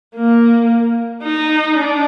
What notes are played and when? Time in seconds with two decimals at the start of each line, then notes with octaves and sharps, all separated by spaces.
0.15 A#3
1.23 D#4
1.77 D4